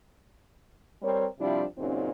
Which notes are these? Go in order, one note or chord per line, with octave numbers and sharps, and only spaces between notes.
G3 C4 A#4 C#5
C3 F3 G3 D4 E4
F#2 A#2 C#3 C4 D#4